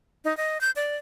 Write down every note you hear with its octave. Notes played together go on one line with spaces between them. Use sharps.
D#4
D#5
G6
D5